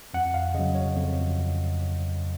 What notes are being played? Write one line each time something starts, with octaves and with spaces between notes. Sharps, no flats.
F2 F#5
F5
C#3 D#5
F#3
C#5
F2